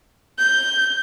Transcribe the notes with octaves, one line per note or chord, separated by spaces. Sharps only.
G6